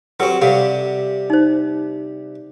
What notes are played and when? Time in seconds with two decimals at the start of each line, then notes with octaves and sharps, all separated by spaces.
0.20 F#3 C4 G4 A4 B4
0.41 C3 G3 A4 F5 F#5
1.30 D#4 C5